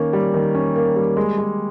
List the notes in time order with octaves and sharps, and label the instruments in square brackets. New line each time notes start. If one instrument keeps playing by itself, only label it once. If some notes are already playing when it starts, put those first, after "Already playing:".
Already playing: [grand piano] D#3 A#3 C#4
G3
D#3
C#4
A#3
G3
G#3
G#3